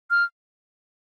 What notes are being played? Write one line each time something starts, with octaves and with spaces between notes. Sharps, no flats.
F6